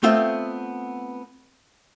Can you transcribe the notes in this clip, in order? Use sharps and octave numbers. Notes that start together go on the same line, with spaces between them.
A3 B3 C4 F4 E5